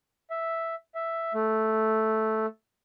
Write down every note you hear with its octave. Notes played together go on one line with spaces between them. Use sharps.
E5
E5
A3